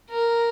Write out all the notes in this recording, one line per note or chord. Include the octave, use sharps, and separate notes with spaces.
A#4